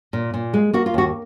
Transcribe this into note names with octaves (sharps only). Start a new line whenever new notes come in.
A#2
A#2
G#3
A#3 F#4
F4
D#2 F#4